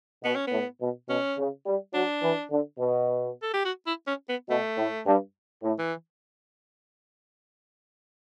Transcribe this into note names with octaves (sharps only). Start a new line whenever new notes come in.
B2 B3
C#4
A2 B3
B2
B2 C#4
C#3
G3
F#3 D4
E3
D3
B2
A4
G4
F#4
E4
C#4
B3
B2 A3
A2
G2
A2
E3